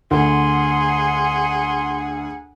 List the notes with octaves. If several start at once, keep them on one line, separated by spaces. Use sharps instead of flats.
D2 G#4 F#5 C6